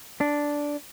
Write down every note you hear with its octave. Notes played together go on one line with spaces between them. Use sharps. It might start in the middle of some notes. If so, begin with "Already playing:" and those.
D4